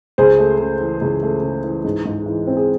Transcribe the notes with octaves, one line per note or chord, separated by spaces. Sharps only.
C#2 G#4 C5
A3
C#3
E3
C#2
A3
C#3
E3
G#2
G#2
E3
C4
G#4